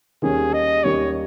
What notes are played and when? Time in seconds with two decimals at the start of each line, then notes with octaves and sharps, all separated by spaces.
0.22 D#2 D#3 G3 C#4 G#4
0.53 D#5
0.84 D#2 D#3 G3 C#4 C#5